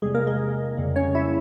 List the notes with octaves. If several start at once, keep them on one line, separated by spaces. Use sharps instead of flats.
E2 C3 G3 G#3 G#4
A#3 A#4
G#3 G#4
F2 C#3 G3 A#3
C#4 C#5
E4 E5